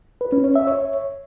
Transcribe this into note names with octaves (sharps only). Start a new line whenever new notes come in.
B4
C#4
C#5
E5
C#5